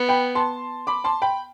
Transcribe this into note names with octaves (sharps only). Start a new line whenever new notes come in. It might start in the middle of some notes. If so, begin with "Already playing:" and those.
Already playing: B3
G5 B5
A5 C6
B5 D6
A5 C6
G5 B5